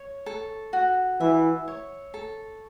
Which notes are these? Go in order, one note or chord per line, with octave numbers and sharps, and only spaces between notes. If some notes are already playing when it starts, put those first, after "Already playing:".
Already playing: C#5
A4
F#4
E3 E5
C#5
A4